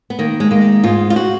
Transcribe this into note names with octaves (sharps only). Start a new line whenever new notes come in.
B3
D#3 A#3
G#3
G#3 A#3
G#2 F4
F4
F#4